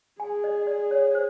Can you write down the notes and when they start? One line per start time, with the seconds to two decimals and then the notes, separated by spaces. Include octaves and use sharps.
0.20 G#4 G#5
0.44 D#5
0.67 D5
0.91 C#5
1.15 C5